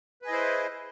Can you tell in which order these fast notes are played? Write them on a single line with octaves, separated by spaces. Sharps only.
B4 G#4 D#5 E4 C5